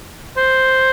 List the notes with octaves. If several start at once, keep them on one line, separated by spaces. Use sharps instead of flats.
C5